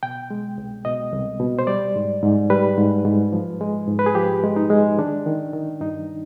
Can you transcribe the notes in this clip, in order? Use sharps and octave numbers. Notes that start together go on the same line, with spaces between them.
B2 G5
G#3
C2
B2 D#5
C2
B2
C5
G3 D5
G#2
G#2
G3 B4
G#2
G#2
F3
G#3
G#2
B4
G#4
F3 G4
G#3
D#4
G#3
D#3 D4
D#3
D#3
G2 D#4